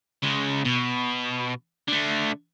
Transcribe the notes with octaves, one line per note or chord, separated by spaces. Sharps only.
C#3 G#3
B2
D3 A3